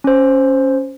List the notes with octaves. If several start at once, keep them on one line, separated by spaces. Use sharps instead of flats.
C#4 C5